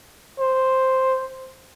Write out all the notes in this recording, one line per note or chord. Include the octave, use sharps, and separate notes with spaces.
C5